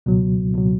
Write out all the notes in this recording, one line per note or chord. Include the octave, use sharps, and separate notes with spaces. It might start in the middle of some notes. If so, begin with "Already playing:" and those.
C#2 B2 F#3
C#2 B2 F#3